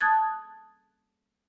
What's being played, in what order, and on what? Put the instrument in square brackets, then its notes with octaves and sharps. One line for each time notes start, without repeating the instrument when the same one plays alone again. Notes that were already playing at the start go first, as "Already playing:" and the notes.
[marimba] A5 D#6 F#6 G#6 A6